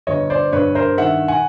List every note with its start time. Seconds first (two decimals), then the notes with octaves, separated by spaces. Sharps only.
0.07 G1 C#5 D#5
0.30 C5 D5
0.52 G2 B4 C#5
0.75 A#4 C5
0.98 D#3 E5 F#5
1.28 F#5 G#5